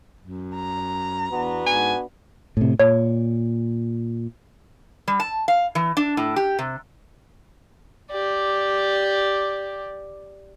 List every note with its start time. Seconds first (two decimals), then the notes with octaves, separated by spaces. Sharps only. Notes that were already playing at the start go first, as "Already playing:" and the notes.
0.21 F#2
0.55 A#5
1.31 E2 B3 D4 F#4
1.66 G#2 G#5
2.57 A2 C3
2.80 A#2 C#5
5.08 G3
5.20 A5
5.48 F5
5.75 E3
5.97 D4
6.17 A2
6.36 G4
6.59 C3
8.11 G4 D5